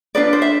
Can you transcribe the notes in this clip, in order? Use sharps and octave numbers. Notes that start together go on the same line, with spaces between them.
D4 F4 B4 D5
C5
E5